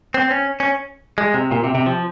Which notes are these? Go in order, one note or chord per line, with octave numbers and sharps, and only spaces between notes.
C4
C#4
C#4
G#3
C3
A#2
C3
C3
F3